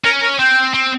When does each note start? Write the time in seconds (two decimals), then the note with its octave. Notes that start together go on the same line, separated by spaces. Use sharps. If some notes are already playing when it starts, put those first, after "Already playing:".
0.04 C#4 A#4
0.22 A#4
0.39 C4 G5
0.74 C4